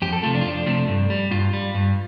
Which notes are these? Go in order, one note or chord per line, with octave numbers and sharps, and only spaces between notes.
F2 G4
A4
C3 F3 A3 F4
D4
F4
F2 D4
C3 F3 A3
G2
G3
G2 F4
G3
G2